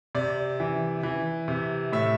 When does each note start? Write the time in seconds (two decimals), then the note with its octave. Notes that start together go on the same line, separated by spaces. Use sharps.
0.15 C3 D5
0.60 E3
1.03 E3
1.48 C3
1.92 A2 E5